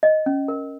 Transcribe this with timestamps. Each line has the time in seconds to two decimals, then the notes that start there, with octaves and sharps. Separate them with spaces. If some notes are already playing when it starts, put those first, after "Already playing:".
0.03 D#5
0.26 C#4
0.48 A#4